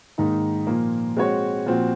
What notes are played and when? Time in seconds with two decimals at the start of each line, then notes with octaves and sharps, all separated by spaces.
0.18 G#2 D#3 A#3 D#4
0.67 A#2 F3 A#3
1.17 G#3 C4 F#4 C#5
1.66 A#2 F3 C4 F#4